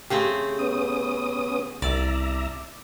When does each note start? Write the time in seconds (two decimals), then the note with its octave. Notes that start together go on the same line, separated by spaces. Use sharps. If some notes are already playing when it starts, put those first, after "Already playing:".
0.10 C#3 A3 C4 G4
0.59 B3 C#4 D#6
1.82 C2 D5 E5 A#5